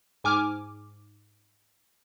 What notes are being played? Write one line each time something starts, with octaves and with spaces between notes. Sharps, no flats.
G#2 G#5 D6 F6